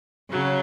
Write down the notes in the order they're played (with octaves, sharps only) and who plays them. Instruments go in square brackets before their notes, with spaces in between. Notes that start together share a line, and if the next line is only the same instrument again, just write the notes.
[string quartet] C#3 F#3